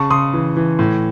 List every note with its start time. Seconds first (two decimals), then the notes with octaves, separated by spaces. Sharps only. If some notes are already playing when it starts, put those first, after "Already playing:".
Already playing: C#3 A5 C#6
0.10 C#3 C6 D#6
0.33 E3
0.57 E3
0.79 A2